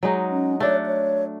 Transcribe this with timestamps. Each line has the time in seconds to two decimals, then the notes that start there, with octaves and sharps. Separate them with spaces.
0.03 F#3 G#3 D#4
0.30 C#4
0.60 A3 D4 C#5 F#5
0.86 C#5